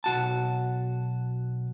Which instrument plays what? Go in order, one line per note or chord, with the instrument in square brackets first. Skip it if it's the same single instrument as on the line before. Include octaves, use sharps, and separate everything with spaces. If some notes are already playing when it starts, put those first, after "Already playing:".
[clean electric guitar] B1 F#4 A5